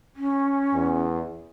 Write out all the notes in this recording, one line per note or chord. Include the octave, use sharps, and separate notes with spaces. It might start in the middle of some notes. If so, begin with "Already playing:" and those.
C#4
E2